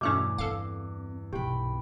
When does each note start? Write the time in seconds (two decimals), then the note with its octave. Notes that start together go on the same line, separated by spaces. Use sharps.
0.01 E2 G2 B2 A3 C#4 D6
0.38 C4 A4 F5
1.33 B1 C3 G4 G5 B5